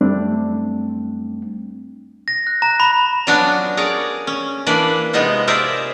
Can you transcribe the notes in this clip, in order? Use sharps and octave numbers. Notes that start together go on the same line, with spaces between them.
F#2 G3 A3 C4 D4
A#6
F#6
A#5
B5
F#3 B3 C#4 D4 F4 F#4
G#4 A#4 C#5 D5
C#4
E3 A#3 D4 B4 D5
C3 G#3 B3 D#4 F4 C5
F4 G#4 A#4 C5 D5 E5